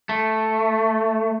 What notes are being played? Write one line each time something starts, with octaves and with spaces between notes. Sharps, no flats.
A3